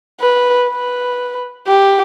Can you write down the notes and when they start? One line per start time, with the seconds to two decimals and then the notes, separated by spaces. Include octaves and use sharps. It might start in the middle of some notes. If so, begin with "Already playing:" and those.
0.21 B4
0.69 B4
1.67 G4